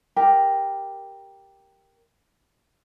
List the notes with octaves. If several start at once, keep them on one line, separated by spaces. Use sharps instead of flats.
G4 A#4